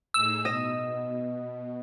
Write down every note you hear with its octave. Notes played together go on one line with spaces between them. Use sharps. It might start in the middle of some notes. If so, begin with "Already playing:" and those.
A2 D#4 G#4 E6
B2 D#5